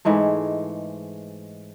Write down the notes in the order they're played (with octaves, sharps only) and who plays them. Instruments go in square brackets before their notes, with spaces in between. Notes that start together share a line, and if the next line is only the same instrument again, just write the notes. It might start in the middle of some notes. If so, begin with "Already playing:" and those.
[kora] G#2 E3 G#3 A3